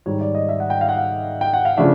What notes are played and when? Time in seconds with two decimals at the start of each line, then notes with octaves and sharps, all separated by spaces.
0.06 G#2 D#3 G3 C#5
0.21 D5
0.35 D#5
0.49 E5
0.60 F#5
0.70 G5
0.81 F5
0.89 F#5
0.97 F5
1.41 G5
1.53 F#5
1.65 F5
1.77 C#3 F3 A3 D4 E5